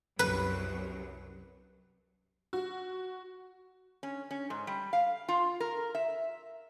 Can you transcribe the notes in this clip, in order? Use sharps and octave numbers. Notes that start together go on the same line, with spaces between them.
C2 F#2 C3 B4
F#4
C#4
C#4
G#2
G3
F5
F4
A#4
E5